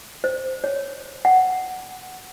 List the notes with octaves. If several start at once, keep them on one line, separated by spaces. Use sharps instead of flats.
C5
C#5
F#5